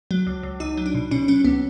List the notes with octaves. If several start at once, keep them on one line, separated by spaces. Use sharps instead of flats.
F#3
C#2
C#2
C#2 D#4
F#3
D4
B2
B2 C#4
F#3 C#4
C#2 B3